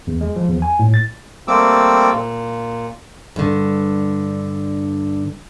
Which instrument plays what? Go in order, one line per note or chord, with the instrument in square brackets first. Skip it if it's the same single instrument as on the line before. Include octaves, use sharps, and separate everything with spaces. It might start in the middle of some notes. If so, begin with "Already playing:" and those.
[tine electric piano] E2
G#3
F3
E2
G#5
A2
A6
[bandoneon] G3 A3 A#3 C4 D6 E6
A#2
[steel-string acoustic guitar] G2 D3